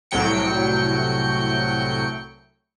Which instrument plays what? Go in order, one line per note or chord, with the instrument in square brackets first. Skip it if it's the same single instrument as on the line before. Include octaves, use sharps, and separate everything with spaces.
[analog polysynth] C2 A2 F#3 G5 C#7